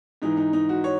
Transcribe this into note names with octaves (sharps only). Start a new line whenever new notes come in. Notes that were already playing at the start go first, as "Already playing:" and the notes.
G#2 E3 D#4
D#4
D#4
F#4
C#5